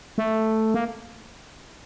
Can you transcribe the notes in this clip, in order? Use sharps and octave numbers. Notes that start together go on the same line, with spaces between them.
A3
A#3